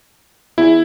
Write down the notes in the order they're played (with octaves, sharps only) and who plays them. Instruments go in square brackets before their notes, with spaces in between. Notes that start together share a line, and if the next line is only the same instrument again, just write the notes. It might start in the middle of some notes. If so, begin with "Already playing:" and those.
[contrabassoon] E2 [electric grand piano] E4